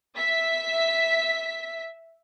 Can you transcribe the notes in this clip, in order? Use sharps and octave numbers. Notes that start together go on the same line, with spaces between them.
E5 B6